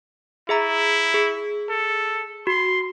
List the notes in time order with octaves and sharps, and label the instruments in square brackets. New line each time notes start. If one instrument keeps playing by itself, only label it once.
[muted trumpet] E4 [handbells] G#4 E5 A#5
[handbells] G#4
[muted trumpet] A4
[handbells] F#4 [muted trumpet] C6